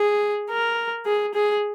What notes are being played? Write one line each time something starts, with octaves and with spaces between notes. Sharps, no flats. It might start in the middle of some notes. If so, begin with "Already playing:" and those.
Already playing: G#4
A#4
G#4
G#4